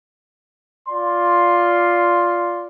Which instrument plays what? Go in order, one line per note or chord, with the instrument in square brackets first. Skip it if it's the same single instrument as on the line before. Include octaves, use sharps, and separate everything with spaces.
[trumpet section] F4 D5 C6